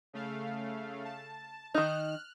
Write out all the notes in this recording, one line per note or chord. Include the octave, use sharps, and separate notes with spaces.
C#3 A3 F5
A5
D#3 D#4 F6 F#6